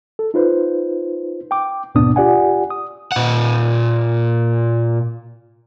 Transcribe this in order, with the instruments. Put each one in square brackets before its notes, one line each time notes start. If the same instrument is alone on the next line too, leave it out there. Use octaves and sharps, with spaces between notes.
[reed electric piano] A4
D#4 F4 B4 C5
G5 D6
D#2 G#2 B2 B3 D4 D#6
F4 G4 D5 F#5 G#5
D#6
[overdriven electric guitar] A#2 F#5